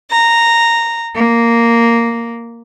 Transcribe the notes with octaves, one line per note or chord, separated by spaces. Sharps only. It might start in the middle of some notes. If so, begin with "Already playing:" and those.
A#5
A#3